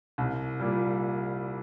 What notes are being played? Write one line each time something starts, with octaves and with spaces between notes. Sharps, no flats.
C2
A#2 G3